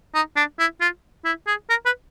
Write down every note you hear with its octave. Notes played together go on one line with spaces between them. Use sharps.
D#4
D4
E4
F4
E4
G#4
A#4
B4